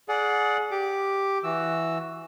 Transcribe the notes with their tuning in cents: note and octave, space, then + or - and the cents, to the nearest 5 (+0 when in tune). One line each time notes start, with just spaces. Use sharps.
G#4 +25 D5 -10 F#5 -20
G4 +0 D6 +0
E3 +0 F#4 +0 E6 +0